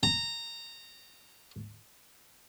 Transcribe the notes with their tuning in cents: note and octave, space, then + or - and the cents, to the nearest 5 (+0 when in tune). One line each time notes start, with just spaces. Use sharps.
A#5 -15